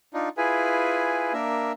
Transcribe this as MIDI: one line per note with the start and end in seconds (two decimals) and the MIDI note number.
0.14 0.29 62
0.14 0.29 63
0.14 0.29 65
0.37 1.33 64
0.37 1.33 65
0.37 1.33 68
0.37 1.33 71
0.37 1.33 80
1.33 1.72 58
1.33 1.72 62
1.33 1.72 70
1.33 1.72 76